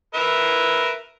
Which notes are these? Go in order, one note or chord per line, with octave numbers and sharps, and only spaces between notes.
A#4 B4 E5